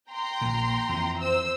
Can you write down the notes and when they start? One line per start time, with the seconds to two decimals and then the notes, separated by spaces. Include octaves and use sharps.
0.11 G5 A#5 C6
0.41 A#1 A#2
0.89 F2 E3
1.19 C5 E6